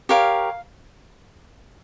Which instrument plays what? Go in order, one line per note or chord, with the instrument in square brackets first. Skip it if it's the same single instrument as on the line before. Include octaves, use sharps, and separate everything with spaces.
[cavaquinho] G4 A#4 C#5 F5